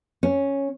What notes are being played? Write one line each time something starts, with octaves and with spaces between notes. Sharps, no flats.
C#4